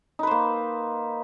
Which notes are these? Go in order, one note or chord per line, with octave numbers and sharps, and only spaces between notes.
A#3 D#4 B4 C5